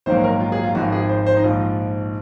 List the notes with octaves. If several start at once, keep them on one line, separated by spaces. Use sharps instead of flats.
A#1 G#2 D#3 F#3 A#3 C5
A#4
F4
G#4
F4
G#1 G#2 F3 F#4
G#4
C5
C5
D#4
A#1 G#2 F3 F4